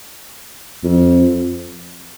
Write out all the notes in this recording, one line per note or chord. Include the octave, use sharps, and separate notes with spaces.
F2